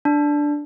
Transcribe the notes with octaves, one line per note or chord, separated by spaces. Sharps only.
D4